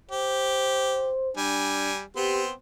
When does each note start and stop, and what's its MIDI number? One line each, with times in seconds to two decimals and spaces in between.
0.11 1.12 67
0.11 1.31 72
1.37 2.01 55
1.37 1.91 62
1.37 2.01 80
2.16 2.52 59
2.16 2.52 60
2.16 2.43 67
2.16 2.52 84